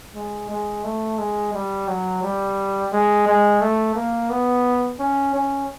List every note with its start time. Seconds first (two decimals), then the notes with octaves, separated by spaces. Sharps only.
0.15 G#3
0.49 G#3
0.84 A3
1.18 G#3
1.53 G3
1.88 F#3
2.23 G3
2.92 G#3
3.27 G#3
3.61 A3
3.95 A#3
4.30 B3
4.99 C#4
5.34 C#4